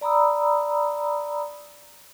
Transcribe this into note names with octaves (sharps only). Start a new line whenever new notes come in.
D5 A#5 B5 D#6 E6